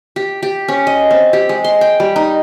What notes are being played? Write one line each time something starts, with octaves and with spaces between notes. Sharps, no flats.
G4
G4
C#4
D#5
C4
G4
G#3
C6
G5
G3
D#4